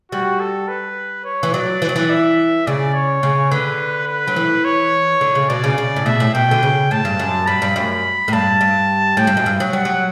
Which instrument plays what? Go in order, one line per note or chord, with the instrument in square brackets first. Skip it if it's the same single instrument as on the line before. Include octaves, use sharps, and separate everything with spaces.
[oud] G3 [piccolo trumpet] F#4
[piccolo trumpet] A4
B4
C#5
[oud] E3
[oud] F#3 [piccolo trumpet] D5
[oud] E3
F#3
E3
[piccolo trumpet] E5
[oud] C#3 [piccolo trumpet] D5
[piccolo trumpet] C#5
[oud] C#3
[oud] D3 [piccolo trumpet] B4
[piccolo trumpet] B4
[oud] F#3
E3
[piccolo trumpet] C#5
[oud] D3
C#3
[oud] B2 [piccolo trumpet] D5
[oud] C#3
C#3
A2
[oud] B2 [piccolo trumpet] E5
[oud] A2
[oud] B2 [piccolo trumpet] G5
[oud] D3
C#3
[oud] A2 [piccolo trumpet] A5
[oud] G2
F#2
[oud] G2 [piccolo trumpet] B5
[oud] G2
[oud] F#2 [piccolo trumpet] B5
[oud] A2
[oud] G2 [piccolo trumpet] A5
[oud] G2
[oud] A2 [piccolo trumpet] G5
[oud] G2
F#2
G2
F#3
[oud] G3 [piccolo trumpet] F#5
[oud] F#3